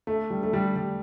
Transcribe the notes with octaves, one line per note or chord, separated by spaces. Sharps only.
A3
G3
A3
G3
G3